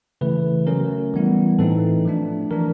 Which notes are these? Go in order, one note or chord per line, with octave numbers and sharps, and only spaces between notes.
C#3 E3 A3 B4
F#3 A3 C#4 A#4
E3 G3 B3 E4
A2 E3 A3 C4 D#4 A4
F3 A3 D4
E3 A3 D4 A#4